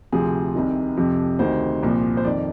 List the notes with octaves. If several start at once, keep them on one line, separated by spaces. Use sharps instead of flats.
D2 C3 F3 G#4
C2 C3 D#3
F2 C3 F3
D2 C3 D#3 C5
C2 A#2 F3
C5
F2 D#3 D5